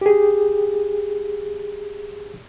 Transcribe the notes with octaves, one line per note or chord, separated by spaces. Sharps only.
G4 G#4